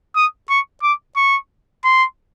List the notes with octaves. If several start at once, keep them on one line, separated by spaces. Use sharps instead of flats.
D#6
C#6
D6
C#6
C6